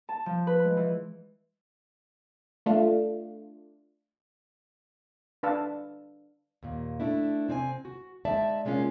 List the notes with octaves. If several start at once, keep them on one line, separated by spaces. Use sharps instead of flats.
A5
F3
B4
G#3
E3
A3 D4 F4
D4 B4 F5 A5 E6
D#2 A#2
A3 D4 E4
C3 C4 D5 G#5
F#4
G#3 D#4 D5 E5 A5
C3 G#3 A#3 C#4 F4